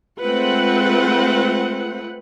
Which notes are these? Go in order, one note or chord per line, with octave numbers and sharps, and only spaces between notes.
G#3 A3 C4 F4 B4 F#5